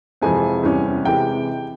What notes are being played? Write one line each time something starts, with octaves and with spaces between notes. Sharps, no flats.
F2 C3 E3 G#3 C4 G#5
E2 C3 G3 C#4
C3 E3 G#3 G5